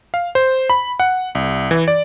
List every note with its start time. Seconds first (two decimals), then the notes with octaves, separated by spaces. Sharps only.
0.14 F5
0.35 C5
0.70 B5
1.00 F#5
1.35 C2
1.71 E3
1.88 D5